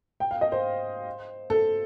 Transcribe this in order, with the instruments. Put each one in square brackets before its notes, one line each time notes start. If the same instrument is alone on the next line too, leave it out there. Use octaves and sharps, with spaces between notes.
[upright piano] G5
F5
D#5
C5
A4